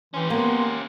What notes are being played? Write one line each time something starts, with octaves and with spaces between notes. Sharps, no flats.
E3 C#4 G4 C6
A#3 B3